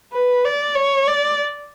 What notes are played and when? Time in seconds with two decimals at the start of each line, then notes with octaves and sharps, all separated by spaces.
0.12 B4
0.44 D5
0.75 C#5
1.07 D5